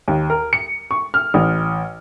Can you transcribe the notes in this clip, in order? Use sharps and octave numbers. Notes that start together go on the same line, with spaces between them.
D#2
A#4
C#7
C#6
F6
A1